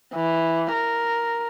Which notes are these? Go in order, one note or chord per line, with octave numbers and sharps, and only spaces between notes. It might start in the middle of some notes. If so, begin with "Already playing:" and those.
E3
A#4